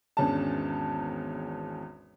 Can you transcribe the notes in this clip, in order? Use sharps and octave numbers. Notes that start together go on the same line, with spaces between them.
G#1 E2 G#3 C#4 D4 A5